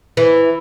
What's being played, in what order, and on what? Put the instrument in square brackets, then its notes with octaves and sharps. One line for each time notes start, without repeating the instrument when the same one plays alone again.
[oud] E3